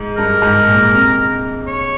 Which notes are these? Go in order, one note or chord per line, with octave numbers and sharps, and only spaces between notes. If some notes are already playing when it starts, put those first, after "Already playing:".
Already playing: G#2
G2 A#4
G#2
A#2
C3
C#5